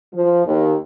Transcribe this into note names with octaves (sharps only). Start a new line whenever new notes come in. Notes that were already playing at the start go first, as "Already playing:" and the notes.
F3
D#2